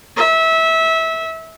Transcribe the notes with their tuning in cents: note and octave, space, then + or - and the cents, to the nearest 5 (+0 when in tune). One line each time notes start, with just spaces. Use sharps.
E5 -20